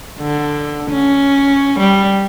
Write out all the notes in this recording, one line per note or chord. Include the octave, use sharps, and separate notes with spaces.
D3
C#4
G3